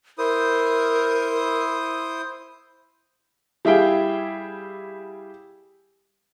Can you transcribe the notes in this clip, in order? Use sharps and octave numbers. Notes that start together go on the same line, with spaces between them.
E4 A#4 C5 D#6
G3 E4 G#4 E5 F5 G5